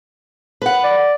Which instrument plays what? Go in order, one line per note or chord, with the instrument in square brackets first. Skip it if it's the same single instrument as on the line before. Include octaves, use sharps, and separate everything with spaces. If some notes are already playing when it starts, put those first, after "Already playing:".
[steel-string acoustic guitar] B4 F#5
[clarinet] D5